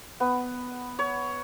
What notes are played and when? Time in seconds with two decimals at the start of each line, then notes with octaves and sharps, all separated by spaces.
0.20 B3
0.99 C#5